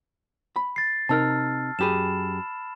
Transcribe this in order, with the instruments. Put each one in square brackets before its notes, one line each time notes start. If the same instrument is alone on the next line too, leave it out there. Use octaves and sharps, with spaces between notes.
[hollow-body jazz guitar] B5
[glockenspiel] A6 C7
[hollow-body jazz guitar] C3 D#4 A#4 [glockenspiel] A5 E6 F6
[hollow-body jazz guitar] F#2 G4 G#4 [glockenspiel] B5 E7